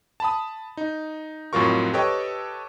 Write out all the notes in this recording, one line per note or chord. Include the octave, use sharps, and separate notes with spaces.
A5 B5 D#6
D#4
F2 A2 F#3 F4 A#4 C#6
G4 A4 B4 C#5 D#5 G5